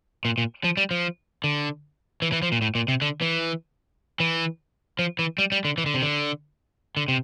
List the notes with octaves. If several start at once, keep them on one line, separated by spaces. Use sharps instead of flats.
A#2
A#2
F3
G3
F3
D3
E3
E3
F3
A#2
A2
A#2
C3
D3
E3
E3
F3
E3
G3
G3
D3
E3
D3
C3
D3
D3
C3